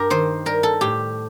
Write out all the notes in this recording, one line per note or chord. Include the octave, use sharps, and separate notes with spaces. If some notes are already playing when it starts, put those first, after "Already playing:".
Already playing: G2 G4 A#4
D#3 C5
G3 A#4
A4
A2 G4